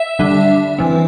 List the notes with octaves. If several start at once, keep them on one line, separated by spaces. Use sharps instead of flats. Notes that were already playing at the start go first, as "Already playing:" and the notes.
Already playing: E5
D3 G3 D4
E3 C4